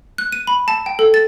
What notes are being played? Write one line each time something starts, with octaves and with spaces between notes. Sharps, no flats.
F#6
D#7
B5
A5
G5
A4
A6